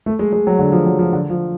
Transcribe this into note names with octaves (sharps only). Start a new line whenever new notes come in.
A3
G#3
G#3
F#3
D3
F3
F#3
F3
D3
F3